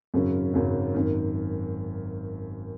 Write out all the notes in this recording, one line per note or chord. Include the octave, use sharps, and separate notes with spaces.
G#1 F#2 C#3 F#3 C#4
G#1 F#2 C#3 F#3 C#4
G#1 F#2 D#3